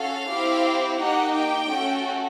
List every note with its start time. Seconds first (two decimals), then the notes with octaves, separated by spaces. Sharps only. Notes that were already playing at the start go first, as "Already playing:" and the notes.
Already playing: C#4 F#4 A4 F5
0.29 C4 E4 G4
0.99 A#3 D#4 G4 F#5
1.34 G5
1.69 A3 C#4 F#4 A4